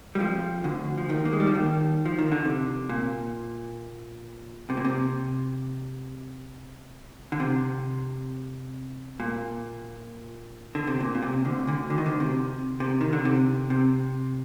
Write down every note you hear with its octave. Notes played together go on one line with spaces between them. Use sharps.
G3
F2 F3
D2 D3
F3
D#2 D#3
A#3
G#3
G3
F3
D#2 D#3
F3
D#3
D3
C3
A#2
C3
A#2
C3
D3
C3
A#2
D3
C3
A#2
A#2
C3
D2 D3
D2 D3
D3
D#3
D2 D3
C3
C3
D#3
D3
C3
C3